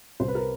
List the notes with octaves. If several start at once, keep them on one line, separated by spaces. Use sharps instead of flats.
C2 C5
B4
A#4